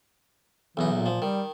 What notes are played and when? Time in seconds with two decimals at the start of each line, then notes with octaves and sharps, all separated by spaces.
0.77 B1 E2 E3 D#4
0.93 A#2
1.06 F3
1.22 D#3 G3